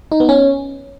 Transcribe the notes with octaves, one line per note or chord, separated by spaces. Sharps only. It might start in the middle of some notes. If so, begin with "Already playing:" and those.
D#4
B3
C#4